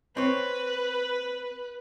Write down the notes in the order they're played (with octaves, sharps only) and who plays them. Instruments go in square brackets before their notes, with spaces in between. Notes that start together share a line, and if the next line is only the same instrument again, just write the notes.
[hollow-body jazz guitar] C4 C#5 [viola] B4